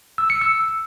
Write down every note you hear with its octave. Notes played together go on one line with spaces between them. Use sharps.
E6
C#7
E6